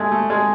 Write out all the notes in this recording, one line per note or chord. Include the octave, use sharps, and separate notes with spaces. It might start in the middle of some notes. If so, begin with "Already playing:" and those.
Already playing: G#3 A3
A3
G#3